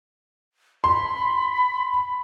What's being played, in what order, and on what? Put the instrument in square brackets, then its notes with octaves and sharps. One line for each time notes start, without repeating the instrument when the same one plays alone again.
[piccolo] B5 [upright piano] C6